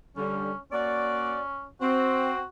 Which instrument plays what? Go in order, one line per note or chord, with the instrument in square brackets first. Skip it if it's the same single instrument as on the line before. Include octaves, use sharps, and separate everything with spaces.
[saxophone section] D3 G3 [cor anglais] C#4
[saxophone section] A#3 F#4 D5 [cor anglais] C#4
[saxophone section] C4 [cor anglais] F#4